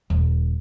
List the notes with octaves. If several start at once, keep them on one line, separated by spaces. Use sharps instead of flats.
D#1